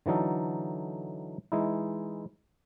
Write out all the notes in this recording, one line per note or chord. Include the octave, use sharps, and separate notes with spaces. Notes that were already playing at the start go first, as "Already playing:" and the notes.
D3 E3 F#3 D#4 A4
E3 G#3 D#4 E4